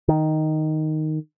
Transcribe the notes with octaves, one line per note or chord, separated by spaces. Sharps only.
D#3